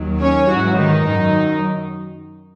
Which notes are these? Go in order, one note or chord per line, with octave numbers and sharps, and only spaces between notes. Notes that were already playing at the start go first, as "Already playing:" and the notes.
Already playing: D#2 D#3 F#3
C#4 C#5
G#2 E3 F#3 F#4
D#3 D#4
F#2 D#3 F#3